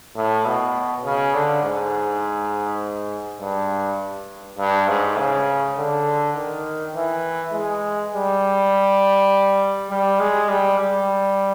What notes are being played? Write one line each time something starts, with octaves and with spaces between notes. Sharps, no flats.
A2
B2
C#3
D3
G#2
G2
G2
G#2
C#3
D3
D#3
E3
G#3
G3
G3
G#3
G3
G3